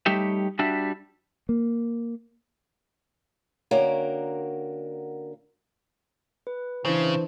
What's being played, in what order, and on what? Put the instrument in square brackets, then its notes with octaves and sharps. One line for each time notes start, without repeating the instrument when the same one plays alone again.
[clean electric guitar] G3 A3 D#4 G4 C#5 E5
G3 D4 F#4 E5
[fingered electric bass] A#3
[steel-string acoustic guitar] D3 A#3 C#4 F#4 A#4 G5
[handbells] B4
[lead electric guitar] C#3 [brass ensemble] E3 [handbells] D4 C5